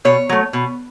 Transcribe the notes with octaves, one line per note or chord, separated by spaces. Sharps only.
B2 C#5
F#3 A3
B2